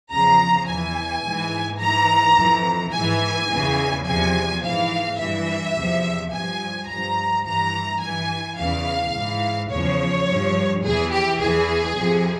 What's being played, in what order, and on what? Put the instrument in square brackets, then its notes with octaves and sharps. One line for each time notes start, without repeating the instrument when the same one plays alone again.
[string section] E2 C#3 F3 A#5
E2 E3 G#5
G#2 E3
G#2 E3 A#5
F2 E3
G#2 E3 G#5
E2 C#3 E3
E2 C3 F3 G#5
G#2 E3 F5
G2 E3 E5
E2 C3 F3
G2 F3 G#5
G2 F3 A#5
G2 E3 A#5
G2 E3 G#5
E2 C#3 E3 F5
G#2 E3
E2 C#3 F3 C#5
G2 F3
E2 E3 G#4
G4
E2 E3 G#4
F2 C3 F3